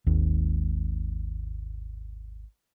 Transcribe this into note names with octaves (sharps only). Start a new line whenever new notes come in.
G#1 D#2 G#2